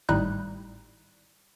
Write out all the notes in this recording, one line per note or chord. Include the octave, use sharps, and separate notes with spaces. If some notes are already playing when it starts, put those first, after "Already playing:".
G#1 A2 G3 D#4 F#6